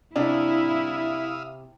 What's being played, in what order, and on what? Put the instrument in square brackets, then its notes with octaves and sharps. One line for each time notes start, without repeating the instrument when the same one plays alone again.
[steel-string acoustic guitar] C3 [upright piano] D4 [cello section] E4 [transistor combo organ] E5 F5 D#6